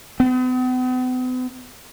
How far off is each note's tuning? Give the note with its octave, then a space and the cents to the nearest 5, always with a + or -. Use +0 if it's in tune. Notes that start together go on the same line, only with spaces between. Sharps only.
B3 +45